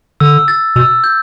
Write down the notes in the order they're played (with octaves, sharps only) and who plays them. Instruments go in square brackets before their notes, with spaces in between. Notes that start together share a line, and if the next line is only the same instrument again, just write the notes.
[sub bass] D3 [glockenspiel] E6
[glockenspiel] A6
[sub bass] B2 [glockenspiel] E6
[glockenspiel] G6